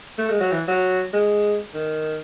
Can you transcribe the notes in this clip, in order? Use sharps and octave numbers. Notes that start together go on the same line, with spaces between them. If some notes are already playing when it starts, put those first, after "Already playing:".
A3
G#3
F#3
E3
F#3
G#3
D#3